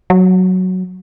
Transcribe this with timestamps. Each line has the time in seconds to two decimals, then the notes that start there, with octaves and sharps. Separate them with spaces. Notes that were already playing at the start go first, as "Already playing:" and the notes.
0.10 F#3